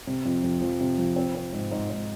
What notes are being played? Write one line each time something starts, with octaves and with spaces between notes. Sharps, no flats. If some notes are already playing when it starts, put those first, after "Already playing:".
C3
F2
F2
F3
C3
F3
C4
C4
G#2
G#2
G#2